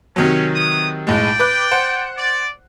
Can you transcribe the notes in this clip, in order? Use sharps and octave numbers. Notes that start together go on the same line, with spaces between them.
C3 D#3 F#3 C#4
B4 C#5 D#6
B1 A2 G#3 D5 G5
B4 D6 F#6
C5 F#5
D5